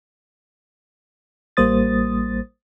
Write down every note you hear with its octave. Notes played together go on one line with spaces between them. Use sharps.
A1 G3 A#3 C5 D#6 A6